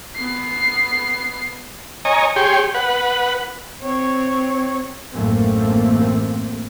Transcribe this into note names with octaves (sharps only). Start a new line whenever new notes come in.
B3 C7
C#5 D#5 G#5 A#5
G4 G#4 C#5 G5 C6
B4 F#5
C4 C#5
A1 F#2 A3 A#3 C4